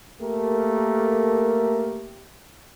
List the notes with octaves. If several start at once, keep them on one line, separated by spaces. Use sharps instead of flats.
A3 A#3 G4 A4 A#4